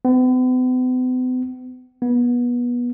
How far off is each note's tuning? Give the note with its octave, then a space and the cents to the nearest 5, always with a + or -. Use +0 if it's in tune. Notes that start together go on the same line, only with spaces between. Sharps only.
B3 +45
B3 -25